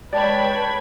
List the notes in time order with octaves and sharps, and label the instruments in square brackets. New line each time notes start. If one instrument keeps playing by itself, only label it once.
[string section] G#3 B5 G#6 [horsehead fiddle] B4 C#5 [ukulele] D5 [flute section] G5 A5